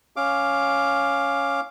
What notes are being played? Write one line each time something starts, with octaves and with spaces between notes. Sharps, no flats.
C#4 F5 D6